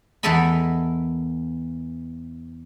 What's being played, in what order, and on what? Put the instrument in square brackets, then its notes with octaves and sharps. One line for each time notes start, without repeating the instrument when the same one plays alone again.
[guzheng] E2 E3 A4 A#4 D#5 B5